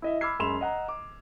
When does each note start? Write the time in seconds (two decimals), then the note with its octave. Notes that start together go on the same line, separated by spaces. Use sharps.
0.02 E4 D#5 E5
0.21 B5 D6 E6 F6 G#6 C7
0.39 F#2 G#3 B5 C6 E7 F7
0.61 D#5 F#5 A#5
0.88 D6